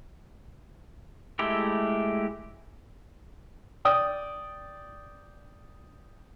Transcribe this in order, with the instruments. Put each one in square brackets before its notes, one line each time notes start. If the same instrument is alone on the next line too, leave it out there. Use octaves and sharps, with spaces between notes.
[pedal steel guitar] G#3 A3 E4 G4
[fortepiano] D5 G5 D#6